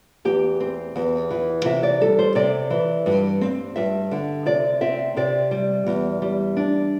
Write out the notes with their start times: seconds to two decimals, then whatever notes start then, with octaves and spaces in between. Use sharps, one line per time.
0.25 E2 G4
0.60 C4
0.96 E2
1.31 E3
1.65 C3 E5
1.83 D5
2.01 G3 A4
2.19 C5
2.35 C3 D5
2.70 E3
3.06 G2
3.41 C4
3.76 G2 E5
4.11 D3
4.46 C3 D5
4.81 C4 E5
5.17 C3 D5
5.51 G3
5.87 E2
6.22 G3
6.57 D4